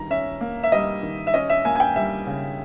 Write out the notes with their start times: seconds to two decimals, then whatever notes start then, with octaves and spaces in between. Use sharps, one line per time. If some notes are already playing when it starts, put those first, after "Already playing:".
Already playing: D#3 G3 A#5
0.10 C#4 E5
0.41 A#3
0.63 E5
0.72 G3 D#5
1.03 D#3
1.27 E5
1.34 C#4 D#5
1.50 E5
1.65 A#3 G#5
1.75 G#5
1.80 G5
1.96 G3 E5
2.27 C#3